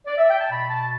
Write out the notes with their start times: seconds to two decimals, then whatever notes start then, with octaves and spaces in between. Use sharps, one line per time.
0.06 D5
0.18 E5
0.29 G5
0.39 A5
0.50 B2 B5
0.68 A5